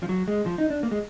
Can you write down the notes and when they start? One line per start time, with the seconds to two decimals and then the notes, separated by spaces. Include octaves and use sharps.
0.03 F3
0.09 F#3
0.28 G#3
0.46 F3
0.58 D#4
0.70 D4
0.83 A#3
0.91 G#3